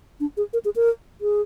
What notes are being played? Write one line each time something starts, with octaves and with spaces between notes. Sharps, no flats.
D4
G#4
A#4
G#4
A#4
G#4